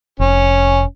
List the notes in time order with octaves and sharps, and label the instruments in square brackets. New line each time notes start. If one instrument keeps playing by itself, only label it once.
[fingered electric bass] F1 [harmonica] C#4